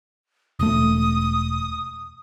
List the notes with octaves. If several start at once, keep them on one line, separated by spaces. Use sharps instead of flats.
E1 A3 D#6